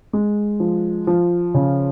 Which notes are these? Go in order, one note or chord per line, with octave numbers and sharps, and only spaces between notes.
G#3
F3
F3
C#3